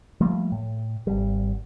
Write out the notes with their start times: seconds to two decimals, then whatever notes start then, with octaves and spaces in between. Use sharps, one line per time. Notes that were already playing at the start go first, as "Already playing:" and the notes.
0.21 F3 G3 A3 A#3
0.52 A2
1.07 G#1 G3